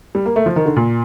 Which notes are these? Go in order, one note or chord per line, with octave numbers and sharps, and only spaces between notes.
G3
A#3
A3
F3
D#3
D3
A#2